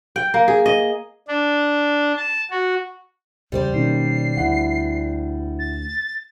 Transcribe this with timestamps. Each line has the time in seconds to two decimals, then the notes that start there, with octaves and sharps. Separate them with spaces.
0.16 G5
0.34 A#3
0.48 G#4
0.66 D#5
1.28 D4
2.17 A5
2.50 F#4
3.52 E2 C#3 G3 C5 D5
3.74 B2 D#3 A#3 C#4 C7
4.37 D2 E4 F#5
5.59 A6